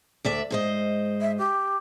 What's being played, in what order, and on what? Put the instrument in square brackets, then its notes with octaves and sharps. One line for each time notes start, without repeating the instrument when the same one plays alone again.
[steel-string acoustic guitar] D2 D5 E5
G#2 C5 D#5
[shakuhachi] E5
G4